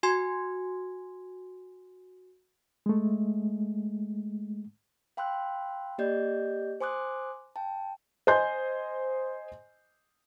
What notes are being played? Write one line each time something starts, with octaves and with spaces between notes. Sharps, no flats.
F#4 G#5 C6 G#6
G#3 A3
F5 G5 B5 C6 E6 F#6
A#3 G4 D5 D#5 G6
C5 G#5 C6 D6 D#6 F#6
G5 A5
C5 D#5 G#5 C6 G6